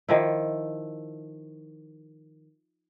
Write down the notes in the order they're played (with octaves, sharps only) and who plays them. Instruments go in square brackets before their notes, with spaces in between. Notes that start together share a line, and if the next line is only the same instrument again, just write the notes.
[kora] D#3 F3 E4